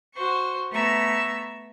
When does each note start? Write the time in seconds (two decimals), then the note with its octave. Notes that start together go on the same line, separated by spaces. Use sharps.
0.15 F#4 C5 C#6
0.72 A3 B3 A#5 C#6 E6